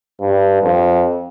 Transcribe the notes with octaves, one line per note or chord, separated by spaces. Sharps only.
G2
F2